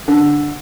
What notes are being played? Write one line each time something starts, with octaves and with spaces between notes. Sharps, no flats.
D3